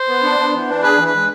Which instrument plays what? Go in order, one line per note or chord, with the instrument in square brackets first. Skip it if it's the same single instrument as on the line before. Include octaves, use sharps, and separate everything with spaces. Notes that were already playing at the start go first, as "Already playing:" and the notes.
Already playing: [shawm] C5
[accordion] B3
D4
B3
E3
D4
[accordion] G#4 [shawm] B4
[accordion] E3
[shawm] B4
[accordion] G#3